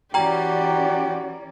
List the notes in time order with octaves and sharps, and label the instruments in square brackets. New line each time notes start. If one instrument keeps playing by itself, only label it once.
[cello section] E3 C#4 D5 [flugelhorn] F#4 [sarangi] G4 [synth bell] G5 A#5